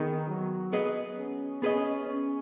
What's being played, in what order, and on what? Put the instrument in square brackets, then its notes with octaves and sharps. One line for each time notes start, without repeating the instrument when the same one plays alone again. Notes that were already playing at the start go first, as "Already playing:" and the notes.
Already playing: [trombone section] D#3 [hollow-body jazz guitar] B3 G#4 B4 D#5
[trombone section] F#3
[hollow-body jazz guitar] B3 G#4 B4 D#5
[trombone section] C#4
[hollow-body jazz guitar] B3 G#4 B4 D#5 [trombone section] C#4
[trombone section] C#4